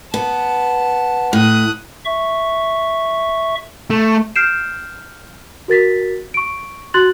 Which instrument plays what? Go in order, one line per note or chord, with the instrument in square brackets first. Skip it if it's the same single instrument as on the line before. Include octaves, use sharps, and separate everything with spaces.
[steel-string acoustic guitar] B3 [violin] A5
[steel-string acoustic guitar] A2 [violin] D#6 F#6
[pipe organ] E5 C#6
[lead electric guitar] A3
[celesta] F6 G6 C7 D7 E7
F#4 A#4 A6 B6
C#6 D7
F#4 C6 F#6 A6 F#7